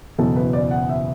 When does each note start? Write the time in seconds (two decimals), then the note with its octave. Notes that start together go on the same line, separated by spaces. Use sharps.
0.18 F#1 E2 B2 A4
0.36 B4
0.53 D5
0.71 F#5
0.89 E5